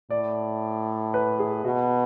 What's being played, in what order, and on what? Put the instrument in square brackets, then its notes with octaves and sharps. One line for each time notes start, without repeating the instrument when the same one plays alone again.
[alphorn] A2 [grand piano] D5
[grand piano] B4
G#4
[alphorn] B2 [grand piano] F#4